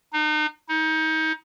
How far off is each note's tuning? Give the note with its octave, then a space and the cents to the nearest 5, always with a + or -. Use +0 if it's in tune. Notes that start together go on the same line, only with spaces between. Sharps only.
D#4 -35
D#4 +30